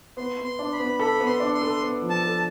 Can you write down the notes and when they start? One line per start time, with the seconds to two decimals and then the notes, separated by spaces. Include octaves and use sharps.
0.17 B3 C6
0.38 B3
0.45 C6
0.59 D4
0.73 B5
0.80 B3
0.99 A4 B5
1.20 B3
1.26 C6
1.40 D4
1.54 C6
1.61 A4
1.82 B3
2.02 F3
2.10 A5
2.23 A4